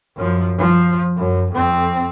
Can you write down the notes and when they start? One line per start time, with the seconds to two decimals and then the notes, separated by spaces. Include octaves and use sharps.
0.16 F#2 F3
0.58 F3
1.17 F#2
1.52 F2 C4